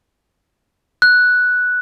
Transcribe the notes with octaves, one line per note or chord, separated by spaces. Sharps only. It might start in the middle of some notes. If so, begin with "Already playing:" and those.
F#6